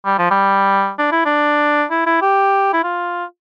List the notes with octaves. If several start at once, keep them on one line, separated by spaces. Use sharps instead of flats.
G3
F3
G3
D4
E4
D4
E4
E4
G4
E4
F4